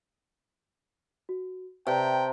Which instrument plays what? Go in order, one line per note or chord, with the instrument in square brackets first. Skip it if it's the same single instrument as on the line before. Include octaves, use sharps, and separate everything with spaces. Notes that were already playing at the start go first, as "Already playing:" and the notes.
[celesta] F#4
[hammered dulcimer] C3 [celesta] B4 D5 E5 [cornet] G5 [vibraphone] A5 A#5